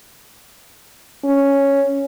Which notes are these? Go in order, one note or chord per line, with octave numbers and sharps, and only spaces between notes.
C#4